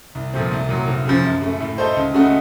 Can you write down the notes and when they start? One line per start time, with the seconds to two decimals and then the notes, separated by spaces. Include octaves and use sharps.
0.15 C2
0.33 A#2 F3 A3 C4
0.52 C2
0.69 A#2 F#3
0.88 F1
1.05 F2 C#3 F3
1.24 F#2
1.41 C#3 A3
1.60 A2
1.78 A3 D#4 A4 C5
1.96 C#2
2.14 C#3 A3 D#4 F#4